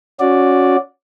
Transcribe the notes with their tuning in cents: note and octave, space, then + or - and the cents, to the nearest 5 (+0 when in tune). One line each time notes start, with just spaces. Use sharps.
C#4 +5 F#4 -15 D5 +0